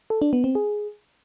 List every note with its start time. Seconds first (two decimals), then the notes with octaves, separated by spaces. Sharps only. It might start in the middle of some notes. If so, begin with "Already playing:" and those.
0.10 A4
0.22 D4
0.33 B3
0.44 C4
0.55 G#4